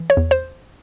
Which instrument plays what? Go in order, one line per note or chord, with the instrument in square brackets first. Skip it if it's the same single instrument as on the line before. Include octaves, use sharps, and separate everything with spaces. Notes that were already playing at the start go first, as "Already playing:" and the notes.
Already playing: [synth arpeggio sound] E3
C#5
E2
C5